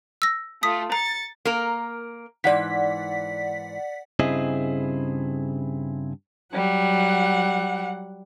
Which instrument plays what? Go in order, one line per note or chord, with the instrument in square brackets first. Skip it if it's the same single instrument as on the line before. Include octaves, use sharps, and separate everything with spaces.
[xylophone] E6 A#6
[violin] A3 F4 [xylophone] D#6 B6
[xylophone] A#5 [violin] A6 C#7
[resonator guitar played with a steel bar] A#3 A#4
[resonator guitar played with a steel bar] G#2 E3 [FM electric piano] D5 F#5 B6
[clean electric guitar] G2 C#3 C4 E4 G#4 D#5
[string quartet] F#3 G3 F#5